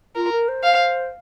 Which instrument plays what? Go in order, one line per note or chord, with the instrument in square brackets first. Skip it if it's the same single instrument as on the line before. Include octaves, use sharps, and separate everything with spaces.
[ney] F4 [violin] A#4
[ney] A#4
C5
[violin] F5